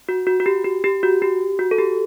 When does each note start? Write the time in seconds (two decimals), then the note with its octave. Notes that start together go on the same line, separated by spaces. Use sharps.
0.09 F#4
0.27 F#4
0.40 F#4
0.46 G4
0.64 G4
0.84 G4
1.03 F#4
1.22 G4
1.59 F#4
1.71 A4
1.78 G4